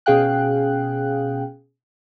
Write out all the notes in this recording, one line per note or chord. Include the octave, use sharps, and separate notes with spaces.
B2 C#4 G#4 F5 G5 F#6